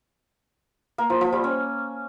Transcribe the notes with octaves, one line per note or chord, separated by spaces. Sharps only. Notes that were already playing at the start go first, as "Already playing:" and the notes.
A#3
F3
F3
G3
C#4